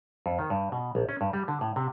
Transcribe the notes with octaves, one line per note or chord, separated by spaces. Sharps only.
F2
D#3
G2
B2
A#1
C#4
G2
G3
D3
A2
C3